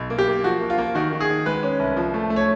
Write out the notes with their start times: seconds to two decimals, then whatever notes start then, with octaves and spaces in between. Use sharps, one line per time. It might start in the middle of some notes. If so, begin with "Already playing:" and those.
Already playing: B1
0.10 A#3
0.19 G4
0.28 A#3
0.44 F3 F#4
0.61 A#3
0.70 F4
0.78 A#3
0.95 D#3 F#4
1.12 D#3
1.20 G#4
1.29 D#3
1.46 G#3 B4
1.63 C#4
1.79 C2
1.97 F3
2.14 A3
2.30 A3
2.36 C#5